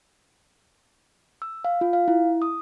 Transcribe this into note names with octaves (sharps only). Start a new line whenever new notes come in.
E6
F5
F4
F5
E4
D#6